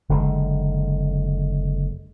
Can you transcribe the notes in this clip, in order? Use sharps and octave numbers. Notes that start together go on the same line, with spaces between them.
F#1 D3 G#3